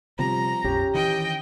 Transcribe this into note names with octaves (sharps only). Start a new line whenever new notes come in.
C3 F3 G3 A#5
A#1 F2 C#4 G4
D#3 E3 D#5 G5